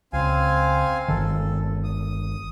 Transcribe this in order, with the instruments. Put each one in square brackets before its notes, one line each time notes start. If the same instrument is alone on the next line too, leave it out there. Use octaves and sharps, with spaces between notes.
[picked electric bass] C#2 [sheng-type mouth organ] C4 F5 G#5
[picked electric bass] G1 D#3 [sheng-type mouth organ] A4
[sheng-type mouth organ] D#6